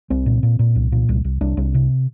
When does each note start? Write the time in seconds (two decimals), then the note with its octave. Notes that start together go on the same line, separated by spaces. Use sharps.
0.10 C2 C4
0.26 A#2
0.43 A#2
0.59 A#2
0.75 C2
0.92 A#2
1.09 C2
1.24 C2
1.41 C2 D4
1.57 C2
1.74 C3